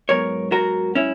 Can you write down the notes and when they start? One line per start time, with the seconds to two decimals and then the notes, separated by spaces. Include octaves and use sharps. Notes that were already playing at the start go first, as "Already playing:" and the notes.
0.09 G#2 F#3 B3 A#4 C#5
0.52 F#4 A#4
0.95 C#4 E4